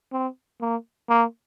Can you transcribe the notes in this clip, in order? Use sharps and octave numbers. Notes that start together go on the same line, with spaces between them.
C4
A#3
A#3